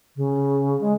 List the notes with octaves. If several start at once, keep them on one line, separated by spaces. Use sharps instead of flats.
C#3
G#3